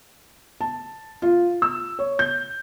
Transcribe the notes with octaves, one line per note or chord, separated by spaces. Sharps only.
A5
F4
E6
C#5
G6